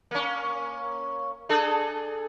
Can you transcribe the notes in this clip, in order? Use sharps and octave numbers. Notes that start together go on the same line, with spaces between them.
A#3 C#4
D4 G#4 A4